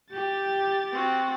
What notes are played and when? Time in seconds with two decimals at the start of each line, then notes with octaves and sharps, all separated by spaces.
0.14 G4 G5 A6
0.92 C4 F#4